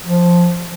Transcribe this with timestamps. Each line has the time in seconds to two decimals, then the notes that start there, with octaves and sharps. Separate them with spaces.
0.06 F3